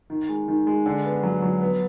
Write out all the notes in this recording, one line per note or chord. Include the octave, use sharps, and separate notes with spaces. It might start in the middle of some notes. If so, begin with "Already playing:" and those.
D#3
G#3
D#3
G#3
D3
B3
F#3
F#3
B3